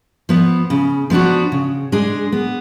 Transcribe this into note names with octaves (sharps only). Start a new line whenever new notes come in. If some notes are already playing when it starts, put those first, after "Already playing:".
F3 B3
C#3
F3 B3 D4 F#4
C#3
G#3 D4 G#4
B3